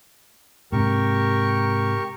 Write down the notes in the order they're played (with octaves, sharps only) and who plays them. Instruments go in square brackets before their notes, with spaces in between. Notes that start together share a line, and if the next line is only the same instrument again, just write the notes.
[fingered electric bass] G#2 C3 [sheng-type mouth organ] G4 A#4 C#6